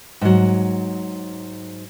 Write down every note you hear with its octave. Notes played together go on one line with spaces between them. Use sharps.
G#2 F#3